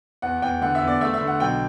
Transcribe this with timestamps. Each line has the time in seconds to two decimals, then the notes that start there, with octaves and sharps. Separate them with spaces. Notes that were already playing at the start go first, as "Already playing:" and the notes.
0.22 E2 F#5
0.42 E2 G5
0.61 D3 F#5
0.75 E5
0.82 E2
0.88 D5
1.01 A3 E5
1.14 E5
1.21 D3
1.28 F#5
1.40 B1 G5